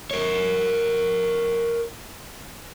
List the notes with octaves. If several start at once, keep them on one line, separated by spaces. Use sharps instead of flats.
A#4 C#5